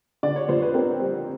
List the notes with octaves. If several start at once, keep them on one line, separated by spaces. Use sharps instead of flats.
D3 D5
C#5
F2 C5
B4
C4 A#4
G3